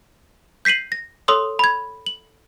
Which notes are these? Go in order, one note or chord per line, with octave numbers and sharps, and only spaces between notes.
G6 B6 C7 D#7 F#7
A#6
A4 C#5 C6 D#6 E6
B5 G#6
F#7